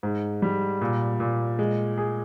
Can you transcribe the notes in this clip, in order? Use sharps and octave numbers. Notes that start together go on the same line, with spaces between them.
G#2
G3
A#2
A#2
G#3
G#4